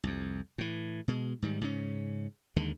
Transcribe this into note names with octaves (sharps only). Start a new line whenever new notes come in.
C2 F2
A2 E3
B2 G#3
G#2 D#3 G3
G#2 C#3 C#4
D#2 D3 D#3 G#3